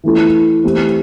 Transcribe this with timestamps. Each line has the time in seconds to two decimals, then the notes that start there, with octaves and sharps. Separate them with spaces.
0.04 E3 A3 E4 A4
0.64 E3 A3 C4 G4